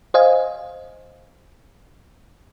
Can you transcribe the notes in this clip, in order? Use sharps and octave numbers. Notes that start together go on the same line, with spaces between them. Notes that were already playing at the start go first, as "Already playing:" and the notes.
C5 D#5 F5 G#5